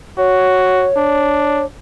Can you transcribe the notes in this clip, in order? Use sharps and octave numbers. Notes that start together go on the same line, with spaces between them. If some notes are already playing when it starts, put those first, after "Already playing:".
F#4 C#5
D4